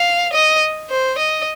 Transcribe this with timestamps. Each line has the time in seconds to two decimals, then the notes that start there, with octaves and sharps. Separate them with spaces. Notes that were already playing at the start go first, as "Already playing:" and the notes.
Already playing: F5
0.33 D#5
0.90 C5
1.18 D#5